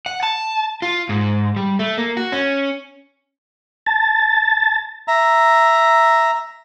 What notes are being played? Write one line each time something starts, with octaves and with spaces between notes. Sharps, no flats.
F#5
A5
F4
G#2
G3
A3
A#3
F#4
C#4
A5
E5 A#5